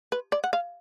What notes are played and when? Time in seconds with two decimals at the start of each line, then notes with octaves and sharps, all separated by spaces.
0.12 B4
0.32 D5
0.44 F#5
0.53 F5